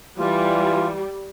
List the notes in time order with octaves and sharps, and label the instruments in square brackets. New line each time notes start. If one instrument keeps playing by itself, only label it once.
[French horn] E3 [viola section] G3 [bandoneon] F4